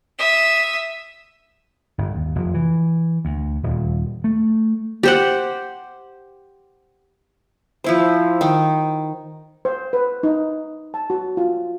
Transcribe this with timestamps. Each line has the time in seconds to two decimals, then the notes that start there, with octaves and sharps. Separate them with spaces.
0.18 E5 D#6
1.98 G1
2.15 D#2
2.35 F1
2.54 E3
3.25 D2
3.63 D#1
4.24 A3
5.03 G4 C5 F#5
7.84 F3 E4 C5
8.41 D#3
9.65 C5
9.93 B4
10.23 D#4
10.94 A5
11.10 F#4
11.37 F4